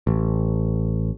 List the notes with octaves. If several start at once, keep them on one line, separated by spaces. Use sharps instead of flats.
A1